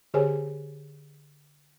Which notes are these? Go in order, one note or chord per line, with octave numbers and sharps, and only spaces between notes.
D3 G4 G#4 C5 C#5 G#5